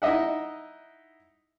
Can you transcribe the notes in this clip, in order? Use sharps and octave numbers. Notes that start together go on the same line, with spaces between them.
D#4 E4 D#5 E5 F#5